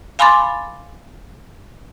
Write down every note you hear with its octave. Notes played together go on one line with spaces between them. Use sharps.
F5 G#5 B5 C6 D6 A6